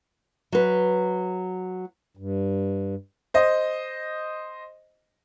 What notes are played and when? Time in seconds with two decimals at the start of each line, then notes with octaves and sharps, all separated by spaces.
0.52 F#3 B4
2.17 G2
3.34 C5 D#5